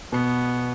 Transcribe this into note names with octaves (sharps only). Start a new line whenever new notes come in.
B2 B3